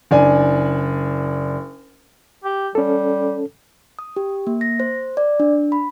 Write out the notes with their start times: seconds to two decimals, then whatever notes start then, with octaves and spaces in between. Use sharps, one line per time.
0.11 F#1 D4 G#5
2.44 G4
2.75 G3 C#4 A4
3.99 D#6
4.16 G4
4.47 A#3
4.61 A#6
4.80 C5
5.17 D5
5.40 D4
5.72 B5